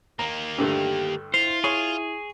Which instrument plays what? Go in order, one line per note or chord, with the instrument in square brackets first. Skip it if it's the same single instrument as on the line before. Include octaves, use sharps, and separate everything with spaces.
[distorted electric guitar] D#3 A#3 [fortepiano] A#5
[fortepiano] G2 D3 A3 [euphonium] G4
[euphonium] E4 [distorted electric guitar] F4 [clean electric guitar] C5
[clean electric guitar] G#4 [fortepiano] C#5 C#6